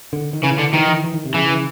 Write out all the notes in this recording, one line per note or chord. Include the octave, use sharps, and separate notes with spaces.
D3
D#3
C#3 E3
D3
D#3 E3
E3
E3
D#3
C3
C#3 E3
C#3